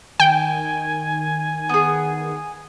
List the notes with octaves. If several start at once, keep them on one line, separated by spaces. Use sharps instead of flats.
D#3 G5 G#5
B3 G#4